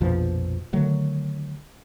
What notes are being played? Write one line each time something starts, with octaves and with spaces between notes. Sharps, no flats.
A#1 F2 B2 F3
D3 D#3 F#3 A3